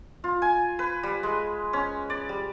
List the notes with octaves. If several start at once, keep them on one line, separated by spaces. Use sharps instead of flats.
F4
G#5
B4
G3
G#3
C#4
D5
G3